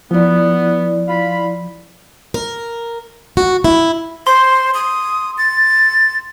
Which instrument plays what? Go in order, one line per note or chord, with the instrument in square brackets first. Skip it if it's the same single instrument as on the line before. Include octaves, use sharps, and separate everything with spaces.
[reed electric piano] F3 [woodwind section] B3 [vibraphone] E4 D5
[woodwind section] F4 F5 B5
[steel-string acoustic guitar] A#4
F#4
E4
[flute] C5 [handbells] C6
[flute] D#6
A6